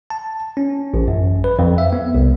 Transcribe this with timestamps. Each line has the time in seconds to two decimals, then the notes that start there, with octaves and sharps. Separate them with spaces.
0.10 A5
0.57 C#4
0.94 A1
1.08 F#2
1.44 B4
1.59 F2
1.78 E5
1.93 B3
2.14 C2